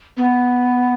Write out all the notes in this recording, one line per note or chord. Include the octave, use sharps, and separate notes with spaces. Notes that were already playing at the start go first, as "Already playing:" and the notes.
B3